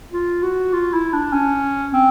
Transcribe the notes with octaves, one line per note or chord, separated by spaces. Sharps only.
F4
F#4
F4
E4
D4
C#4
C4